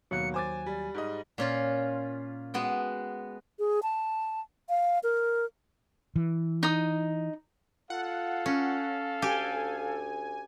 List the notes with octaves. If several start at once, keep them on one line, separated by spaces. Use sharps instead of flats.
D#2 B2 F#3 A#3 F#6 C#7
C5 G#5 D6 A6
G3
G#2 G3 D#5
A#2 C#4 F4
G#3 B3 F#4 G5
G#4
A5
F5
A#4
E3
D#4 D#6
F4 A4 F5 F#5
C#4
D2 G4 G#5